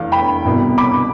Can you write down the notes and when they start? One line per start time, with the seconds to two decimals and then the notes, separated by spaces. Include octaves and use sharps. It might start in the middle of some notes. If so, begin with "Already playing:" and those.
Already playing: F1 E2 F5
0.12 G5 B5
0.45 C2 B2
0.78 B5 D6